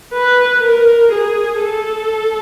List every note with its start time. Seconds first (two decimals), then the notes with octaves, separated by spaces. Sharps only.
0.13 B4
0.63 A#4
1.12 G#4
1.62 A4